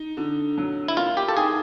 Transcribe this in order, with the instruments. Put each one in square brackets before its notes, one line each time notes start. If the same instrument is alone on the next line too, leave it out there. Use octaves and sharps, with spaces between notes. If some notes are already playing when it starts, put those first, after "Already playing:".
Already playing: [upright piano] D#4
D3
F#3
[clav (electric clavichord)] E4
[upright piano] A#3 [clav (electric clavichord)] F4
[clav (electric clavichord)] G4
A4
[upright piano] D#4 [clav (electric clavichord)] G#4